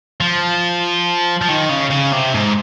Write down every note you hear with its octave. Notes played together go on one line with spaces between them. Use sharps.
F3
F3
D#3
C#3
C#3
C3
G#2